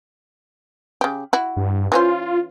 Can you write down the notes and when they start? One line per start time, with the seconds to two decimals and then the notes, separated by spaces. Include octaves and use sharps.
1.01 C#3 G4
1.33 E4 F#4
1.57 G2
1.92 E3 C#4 F4 C5